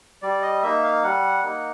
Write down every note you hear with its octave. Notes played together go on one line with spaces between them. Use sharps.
G3 D5
D#5
A#3 D#4 E5
F5
G3 F#5
A#3 D#4